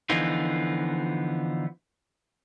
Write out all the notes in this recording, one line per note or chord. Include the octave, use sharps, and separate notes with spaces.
D3 E3 F3 B3 D#4 F4